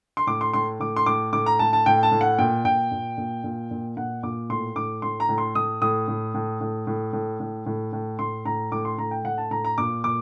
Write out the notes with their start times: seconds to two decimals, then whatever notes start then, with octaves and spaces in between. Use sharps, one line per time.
0.17 C6
0.27 A2 D6
0.41 C6
0.53 A2 C6
0.80 A2 D6
0.96 C6
1.06 A2 D6
1.33 A2 D6
1.46 A#5
1.59 A2 A5
1.73 A5
1.86 A2 G5
2.03 A5
2.12 A2
2.21 F#5
2.38 A#2 G5
2.65 A#2 G5
2.91 A#2
3.18 A#2
3.44 A#2
3.71 A#2
3.97 A#2 F#5
4.23 A#2 D6
4.50 A2 C6
4.76 A2 D6
5.02 A2 C6
5.20 A#5
5.29 A2
5.38 C6
5.55 A2 D#6
5.81 A2 D#6
6.08 A2
6.34 A2
6.61 A2
6.87 A2
7.13 A2
7.40 A2
7.66 A2
7.93 A2
8.19 A2 C6
8.45 A2 A#5
8.72 A2 D6
8.85 C6
8.98 A2 A#5
9.11 G5
9.24 A2 F#5
9.38 A5
9.51 A2 A#5
9.65 A#5
9.78 A#2 D6
10.04 A#2 D6